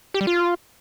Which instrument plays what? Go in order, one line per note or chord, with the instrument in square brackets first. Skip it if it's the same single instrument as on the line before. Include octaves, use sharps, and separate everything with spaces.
[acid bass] G4
G3
F4